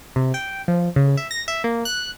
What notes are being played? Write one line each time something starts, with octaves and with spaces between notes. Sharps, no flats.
C3
G5
F3
C#3
E5
A#6
E5
A#3
F#6